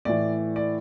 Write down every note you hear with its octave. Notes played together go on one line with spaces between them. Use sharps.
A2 E3 D5
D5